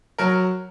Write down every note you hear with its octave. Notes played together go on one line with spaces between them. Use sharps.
F#3 A#4